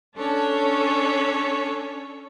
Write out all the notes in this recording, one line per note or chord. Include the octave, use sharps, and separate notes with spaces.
C#4 D4 A4 C#5